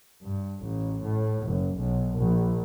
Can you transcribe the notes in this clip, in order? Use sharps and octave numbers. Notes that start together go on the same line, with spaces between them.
G2
A1
A2
F#1
B1
A#1